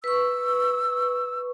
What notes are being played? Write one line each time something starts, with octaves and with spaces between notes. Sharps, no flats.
B4 C#6 E6